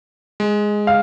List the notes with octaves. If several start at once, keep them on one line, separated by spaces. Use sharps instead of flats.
G#3
F5